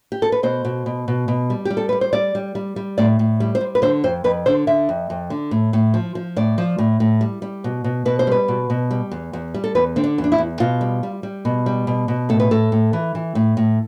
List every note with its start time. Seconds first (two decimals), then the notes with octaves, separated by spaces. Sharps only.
0.12 G4
0.22 A4
0.32 B4
0.43 B2 C5
0.65 B2
0.86 B2
1.08 B2
1.28 B2
1.50 G3
1.65 G3 G4
1.77 A4
1.89 G3 B4
2.01 C5
2.13 G3 D5
2.35 G3
2.55 G3
2.76 G3
2.98 A2 D5
3.19 A2
3.40 G3
3.55 C5
3.61 G3
3.75 B4
3.82 D3 C5
4.04 F2 C5
4.24 F2 B4
4.46 D3 C5
4.67 D3 E5
4.89 F2
5.10 F2
5.30 D3
5.51 A2
5.73 A2
5.94 F3
6.15 F3
6.36 A2 D5
6.58 F3
6.78 A2
7.00 A2
7.21 G3
7.42 G3
7.64 B2
7.84 B2
8.05 B2 B4
8.19 C5
8.27 G3 B4
8.48 B2
8.70 B2
8.91 G3
9.11 E2
9.33 E2
9.54 G3
9.64 A4
9.75 E2 B4
9.96 D3 C4
10.04 D4
10.18 E2
10.24 D4
10.32 E4
10.38 E2
10.60 B2 F4
10.81 G3
11.03 G3
11.23 G3
11.45 B2
11.66 G3
11.87 B2
12.08 B2
12.29 A2 A4
12.40 B4
12.51 A2 A4
12.72 A2
12.93 E3
13.15 E3
13.35 A2
13.57 A2